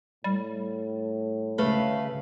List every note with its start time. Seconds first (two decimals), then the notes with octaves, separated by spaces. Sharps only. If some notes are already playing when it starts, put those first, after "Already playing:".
0.24 A2 G3
1.58 D2 C#3 A3 B4 F5